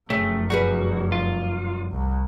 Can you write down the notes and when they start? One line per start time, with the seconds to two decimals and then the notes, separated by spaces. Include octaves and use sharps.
0.10 F1 F#2 C#3 A3 C4 C#4
0.50 G3 F#4 G#4 B4
1.12 F4
1.91 C2